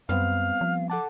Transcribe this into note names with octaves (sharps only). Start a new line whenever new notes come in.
F#2 G3 B3 C4 F5 F6
F3
A4 F#5 A5 D6